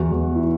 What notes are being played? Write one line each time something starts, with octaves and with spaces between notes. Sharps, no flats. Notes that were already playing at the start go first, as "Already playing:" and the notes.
Already playing: E2 F#4
E2
E4